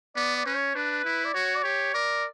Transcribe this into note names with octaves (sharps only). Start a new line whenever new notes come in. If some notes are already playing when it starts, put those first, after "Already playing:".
B3 D5
D5
C#4 B4
C#5
D4 B4
E4
D5
F#4 C#5
D5
G4 C#5
A#4 D5